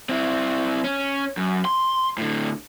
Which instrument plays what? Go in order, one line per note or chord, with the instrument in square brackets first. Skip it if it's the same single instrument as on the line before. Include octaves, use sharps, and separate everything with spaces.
[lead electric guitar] C4 E4
C#4
F#2
C6
A2 D3